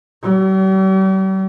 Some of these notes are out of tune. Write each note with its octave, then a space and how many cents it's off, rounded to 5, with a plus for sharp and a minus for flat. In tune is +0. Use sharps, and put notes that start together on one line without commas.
G3 -45